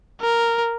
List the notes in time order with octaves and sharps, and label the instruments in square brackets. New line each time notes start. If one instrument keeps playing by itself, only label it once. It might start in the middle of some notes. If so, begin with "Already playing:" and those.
[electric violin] A#4